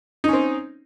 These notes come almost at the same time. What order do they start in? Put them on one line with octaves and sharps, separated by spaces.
D#4 C#4 C4